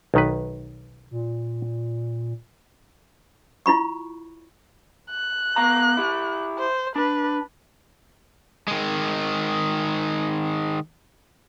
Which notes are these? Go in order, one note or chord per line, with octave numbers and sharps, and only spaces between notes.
B1 D#3 B4
A#2
E4 F4 B5 C#6
F#6
B3 F5 A#5
E4 G4
C5
D4 B4
D#3 G#3